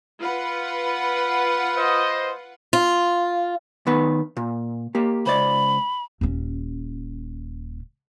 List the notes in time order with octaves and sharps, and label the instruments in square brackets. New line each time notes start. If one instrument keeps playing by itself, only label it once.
[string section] F4 B4 F#5
[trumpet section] C5 D#5
[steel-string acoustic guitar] F4
[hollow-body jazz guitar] D#3 B3 B4
A#2
A#3 G4
[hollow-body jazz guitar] C#2 C5 D5 [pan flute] B5
[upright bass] D#1 C#4